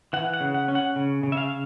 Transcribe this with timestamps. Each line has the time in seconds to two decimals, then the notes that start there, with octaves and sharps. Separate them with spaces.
0.13 E3 F#5
0.34 F#5
0.41 C#3
0.54 F#5
0.68 C#4
0.75 F#5
0.96 C#3
1.23 C#3
1.32 E5
1.37 F5